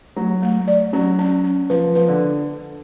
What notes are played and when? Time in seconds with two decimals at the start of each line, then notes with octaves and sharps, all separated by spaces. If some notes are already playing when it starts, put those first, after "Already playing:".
0.16 F#3 A3
0.42 A3
0.68 D5
0.93 F#3 C#4
1.19 C#4
1.44 C#4
1.70 F3 B4
1.95 F3 B4
2.08 D3